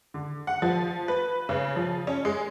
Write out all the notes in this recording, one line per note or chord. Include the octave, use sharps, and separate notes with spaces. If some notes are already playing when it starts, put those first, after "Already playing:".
D3
F#5
F3
B4
C#3
F3
C#4
G#3